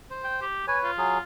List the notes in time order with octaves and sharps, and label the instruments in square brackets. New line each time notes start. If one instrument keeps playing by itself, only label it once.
[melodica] C5
[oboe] G5
G4
[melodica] B4 C#5 [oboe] G#5
[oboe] F4
[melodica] F#3 G#4